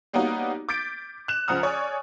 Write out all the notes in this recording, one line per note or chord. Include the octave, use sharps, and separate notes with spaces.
G3 A#3 B3 C#4 D#4 F#4
D6 G6 A6 B6 D7
F#6 E7
C#2 F3 F#5 A#5 D#6 F6
C#5 D5 G#5